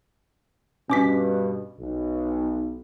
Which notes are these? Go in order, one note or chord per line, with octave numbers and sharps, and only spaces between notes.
G2 B2 C#4 D6 B6
B1